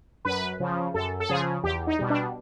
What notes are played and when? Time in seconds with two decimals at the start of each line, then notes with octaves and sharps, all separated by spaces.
0.25 F#2 B4
0.60 C#3 F3
0.94 F#2 A4
1.20 A4
1.29 C#3 F3 G#4
1.64 E2 G4
1.87 D#4
1.99 B2 G3
2.10 D4